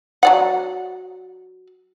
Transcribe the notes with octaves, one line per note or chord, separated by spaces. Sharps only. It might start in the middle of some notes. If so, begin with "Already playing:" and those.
F#3 D5 F#5